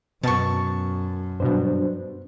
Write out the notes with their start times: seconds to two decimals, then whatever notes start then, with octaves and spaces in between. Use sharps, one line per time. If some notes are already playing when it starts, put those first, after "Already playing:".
0.23 F#2 B2 A5 C#6
1.40 G2 B2 F#3 D4 C5